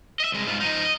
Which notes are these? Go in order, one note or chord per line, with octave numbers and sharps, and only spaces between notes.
D#5 E5
C2 G#3
G#2 F4
F3 D#4
D#5